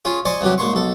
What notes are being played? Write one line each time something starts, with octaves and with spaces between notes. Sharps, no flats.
C#4 F4 G#4
C5 D5 D#5 G#5 C#6
C2 E3 F#3 G4
G#2 A#3 C6 C#6
B1 A4